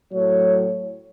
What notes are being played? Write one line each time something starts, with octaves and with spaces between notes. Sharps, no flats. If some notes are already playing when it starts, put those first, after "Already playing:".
A2 F#3 A3 C#5